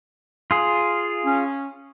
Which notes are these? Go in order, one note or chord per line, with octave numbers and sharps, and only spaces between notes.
F4 G#4
C#4